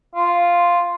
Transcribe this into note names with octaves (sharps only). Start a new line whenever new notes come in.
F4